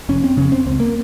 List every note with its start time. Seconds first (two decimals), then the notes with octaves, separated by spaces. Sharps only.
0.09 F1 C#4
0.24 C4
0.37 F2 C#3 C#4
0.52 C4
0.66 C#2 C4
0.80 A#3